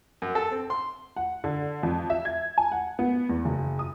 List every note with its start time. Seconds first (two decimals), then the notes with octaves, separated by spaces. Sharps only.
0.22 F#2
0.35 A4
0.51 C4
0.70 C6
1.16 F#5
1.44 D3
1.83 F2
2.10 E5
2.25 G#6
2.58 G#5
2.72 F#5
2.99 B3
3.29 E2
3.45 F#1
3.79 D#6